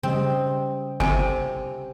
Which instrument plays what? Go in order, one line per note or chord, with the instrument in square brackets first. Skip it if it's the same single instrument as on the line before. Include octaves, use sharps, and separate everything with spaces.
[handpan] C#3 G3 D#5 [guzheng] C4
[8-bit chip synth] G1 [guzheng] C3 [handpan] C4 [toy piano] G#5